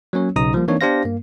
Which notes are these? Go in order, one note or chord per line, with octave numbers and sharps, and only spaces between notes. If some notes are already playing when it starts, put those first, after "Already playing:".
F#3 A#3 C#4 C#5
B1 C#3 D#4 A#5 D#6
F3 G3 A#3
E3 A#3 C4 D4 D#4 C#5
B3 D4 G4 C5 F5 A#6
G2 A#3